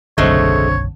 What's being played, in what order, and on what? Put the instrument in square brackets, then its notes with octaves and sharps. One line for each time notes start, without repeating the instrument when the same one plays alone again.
[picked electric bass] F#1 B1 [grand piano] D3 C4 [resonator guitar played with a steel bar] G#3 A3 [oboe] C#5